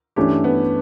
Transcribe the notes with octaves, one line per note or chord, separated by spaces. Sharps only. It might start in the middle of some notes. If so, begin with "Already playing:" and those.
G2 E3 A3 C#4 D4 G4
B3